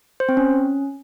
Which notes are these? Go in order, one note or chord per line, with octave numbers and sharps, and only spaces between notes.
C5
C4
C#4